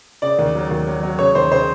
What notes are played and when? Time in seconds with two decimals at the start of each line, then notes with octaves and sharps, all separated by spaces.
0.22 C#3 D5
0.39 D#2
0.55 F#3
0.71 D#2
0.87 F#3
1.03 F#3
1.19 C#3 C#5
1.35 D#2 C5
1.52 C#3 C5